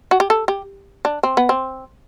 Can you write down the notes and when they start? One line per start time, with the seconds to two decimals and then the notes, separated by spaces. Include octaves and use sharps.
0.11 F#4
0.20 G4
0.30 A4
0.48 G4
1.05 D4
1.23 C4
1.37 B3
1.49 C4